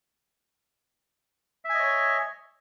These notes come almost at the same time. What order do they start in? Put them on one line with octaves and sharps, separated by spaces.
E5 G#5 D#5 C#5